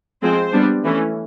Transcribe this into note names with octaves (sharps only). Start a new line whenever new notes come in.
F3 G#3 C4 C5
G3 B3 D4
E3 A3 C#4